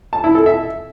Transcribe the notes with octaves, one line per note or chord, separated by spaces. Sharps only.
A5
E4
A4
E5